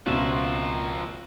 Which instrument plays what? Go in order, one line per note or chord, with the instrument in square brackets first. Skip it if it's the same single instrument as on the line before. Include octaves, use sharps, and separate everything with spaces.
[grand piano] C#2 [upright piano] B2 C4 [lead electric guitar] F3 A#3 [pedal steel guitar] F4 F#4 E5